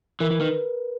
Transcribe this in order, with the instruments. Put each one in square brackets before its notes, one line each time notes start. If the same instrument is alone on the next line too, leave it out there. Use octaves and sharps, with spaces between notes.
[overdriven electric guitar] E3 [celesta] A#4
[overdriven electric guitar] E3
[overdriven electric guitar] D#3 [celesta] B4